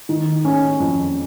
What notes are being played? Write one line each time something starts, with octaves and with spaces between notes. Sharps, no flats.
D#3
C#4
F2